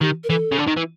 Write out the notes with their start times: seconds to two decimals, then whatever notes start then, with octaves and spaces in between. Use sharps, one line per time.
0.01 D#3 G4
0.24 A#4
0.30 E3 A4
0.52 C#3
0.58 D3
0.67 D#3
0.77 E3